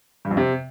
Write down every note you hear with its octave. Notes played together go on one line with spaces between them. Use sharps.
G2
F2
C3